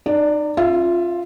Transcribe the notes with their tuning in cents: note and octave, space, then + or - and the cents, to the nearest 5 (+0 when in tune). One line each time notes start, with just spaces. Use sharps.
D#4 -35 D5 +0
C#4 -30 F4 +0 E5 +25